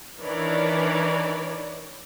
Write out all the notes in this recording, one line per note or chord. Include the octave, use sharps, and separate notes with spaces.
D#3 E3 D4 C#5 D5